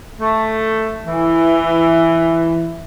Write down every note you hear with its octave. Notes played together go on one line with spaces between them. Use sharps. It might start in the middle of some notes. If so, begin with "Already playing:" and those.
A3
E3